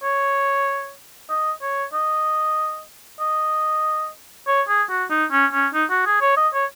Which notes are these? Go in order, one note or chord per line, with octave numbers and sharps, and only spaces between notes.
C#5
D#5
C#5
D#5
D#5
C#5
G#4
F#4
D#4
C#4
C#4
D#4
F#4
G#4
C#5
D#5
C#5